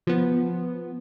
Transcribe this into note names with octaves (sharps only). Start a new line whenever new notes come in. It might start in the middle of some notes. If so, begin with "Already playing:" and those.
F3 B3